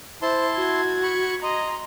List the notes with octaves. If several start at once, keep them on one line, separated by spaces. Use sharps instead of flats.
E4 C5 A5 C6
F#4 G#6
B5 C#6
D#5 A#5 C6